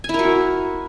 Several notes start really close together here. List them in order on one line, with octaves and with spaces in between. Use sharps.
G#5 E4 A#4 F#4